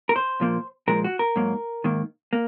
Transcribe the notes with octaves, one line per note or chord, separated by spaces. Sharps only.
A#4
C5
A#2 F3 A#3
A#2 F3 G#3 A#4
F#4
A#4
G#2 F#3 A#3
G#2 D#3 A#3
A#3